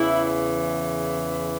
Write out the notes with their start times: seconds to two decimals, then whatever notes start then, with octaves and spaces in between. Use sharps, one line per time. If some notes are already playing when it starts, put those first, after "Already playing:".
Already playing: E2 C#3 E3 E4